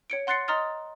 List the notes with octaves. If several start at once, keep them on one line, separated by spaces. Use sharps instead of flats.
C#5 C#7 D7
F#5 C6 F#6 A6 C7 C#7
D#5 A#5 C6 D#6 F6 A6